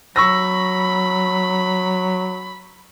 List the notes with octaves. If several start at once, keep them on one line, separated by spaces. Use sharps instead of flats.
F#3 B5 C#6 E6 A#6